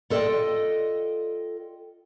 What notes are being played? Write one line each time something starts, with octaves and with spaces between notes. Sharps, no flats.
F4 A4 D5 D#5 G5